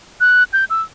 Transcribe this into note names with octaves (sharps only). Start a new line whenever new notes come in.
F#6
G6
E6